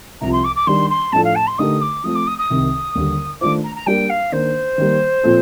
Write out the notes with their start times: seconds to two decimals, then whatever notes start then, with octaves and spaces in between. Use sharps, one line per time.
0.21 C2 C3 F3 A#5
0.33 C6
0.44 D6
0.56 D6
0.67 D#3 G3 D4 C6
0.90 C6
1.13 A2 F3 A3 D4 A4 A5
1.24 F5
1.35 A5
1.47 C6
1.59 D3 A3 D#4 G4 A#4 D#6
1.82 D6
2.04 F3 A3 C4 D#6
2.15 D6
2.27 D#6
2.39 D#6
2.50 C2 C3 D#3
2.95 D#2 D3 G3
3.41 D#3 A3 D4 F4 C5 D6
3.64 A#5
3.75 A#5
3.87 G3 A#3 D4 G4 A#4 G5
4.10 F5
4.32 D#3 A#3 D4 C5
4.78 D#3 G3 A#3
5.24 A#2 F3 C4 F4 A4